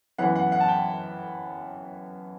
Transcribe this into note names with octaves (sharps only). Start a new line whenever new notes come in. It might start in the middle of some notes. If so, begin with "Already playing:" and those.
F#2 E3 B3 F#5
F#5
F#5
A5
G5